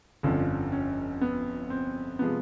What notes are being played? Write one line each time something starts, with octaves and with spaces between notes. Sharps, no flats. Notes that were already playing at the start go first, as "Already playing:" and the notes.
G1 F2 D3 F3 C#4
C#4
B3
C4
C3 F3 G#3 B3